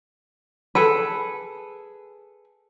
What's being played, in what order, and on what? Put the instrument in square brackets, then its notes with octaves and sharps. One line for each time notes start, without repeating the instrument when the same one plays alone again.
[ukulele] G#4 A4 B4